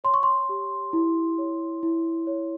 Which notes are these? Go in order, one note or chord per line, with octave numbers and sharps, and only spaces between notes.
C#5 C6
C#6
C6
G4
E4
C#5
E4
C#5